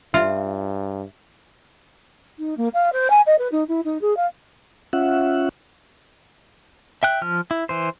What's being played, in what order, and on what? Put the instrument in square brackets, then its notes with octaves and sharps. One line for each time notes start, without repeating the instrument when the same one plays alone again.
[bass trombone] G2 [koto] F4 [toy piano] E5
[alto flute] D#4
A#3
F5
C5
G#5
D#5
B4
D#4
E4
D#4
G#4
F5
[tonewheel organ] C#4 F4 E5 F#5
[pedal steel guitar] E5 G5 F#6
F3 F6
E4
E3 C5